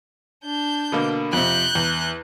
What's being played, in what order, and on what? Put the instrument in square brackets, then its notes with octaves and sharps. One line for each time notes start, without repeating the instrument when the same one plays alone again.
[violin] D4 G6
[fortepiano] B2 D3 A#3
[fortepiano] F2 C3 [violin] F#6 G6
[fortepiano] E2